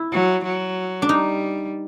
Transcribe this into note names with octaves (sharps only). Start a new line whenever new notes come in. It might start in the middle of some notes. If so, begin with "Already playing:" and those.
Already playing: E4
F#3
F#3
D4
G3 D#4